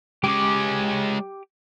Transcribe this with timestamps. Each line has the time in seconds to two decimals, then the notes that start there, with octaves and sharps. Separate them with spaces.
0.24 G#3 C#4 G4 D6